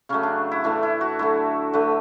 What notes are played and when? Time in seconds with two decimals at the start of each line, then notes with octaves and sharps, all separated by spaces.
0.09 C#3 F#3 A3 C#4
0.23 D4
0.52 E4
0.64 A2 E3 A3 D4
0.83 E4
1.01 F#4
1.19 D3 F#3 A3 E4
1.73 D3 A3 B4